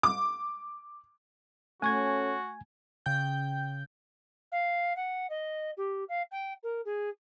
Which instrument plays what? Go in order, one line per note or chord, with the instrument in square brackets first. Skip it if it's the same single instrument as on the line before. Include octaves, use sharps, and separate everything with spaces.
[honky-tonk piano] D6
[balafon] A3 C#6 [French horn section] C#4 A4 [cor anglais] F#4 [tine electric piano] G#5 G#6
[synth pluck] C#3 G5 G6
[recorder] F5
F#5
D#5
G4
F5
G5
A#4
G#4